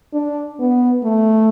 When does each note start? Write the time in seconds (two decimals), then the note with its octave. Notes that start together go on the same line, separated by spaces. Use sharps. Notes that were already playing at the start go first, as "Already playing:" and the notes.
0.14 D4
0.59 B3
1.04 A3